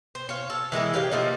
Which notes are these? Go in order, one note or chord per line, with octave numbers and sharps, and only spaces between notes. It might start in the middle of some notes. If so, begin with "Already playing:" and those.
C5
C#5 F5
A4
E3 G#3 A#3 E4
C#3 B3 G4 F5
F3 A3 A#3 D#4